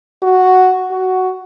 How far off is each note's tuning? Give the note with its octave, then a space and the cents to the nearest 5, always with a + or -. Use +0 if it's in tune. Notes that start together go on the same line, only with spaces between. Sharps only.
F#4 +0
F#4 +10